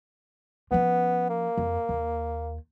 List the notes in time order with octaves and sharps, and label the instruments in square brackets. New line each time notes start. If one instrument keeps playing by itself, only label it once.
[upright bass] F3 C#4 [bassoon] B3
[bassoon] A#3
[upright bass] F2
D#2